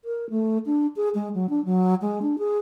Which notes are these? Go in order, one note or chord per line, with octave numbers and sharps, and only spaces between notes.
A#4
A3
D4
G#4
G#3
F#3
D4
F#3
G#3
D4
G#4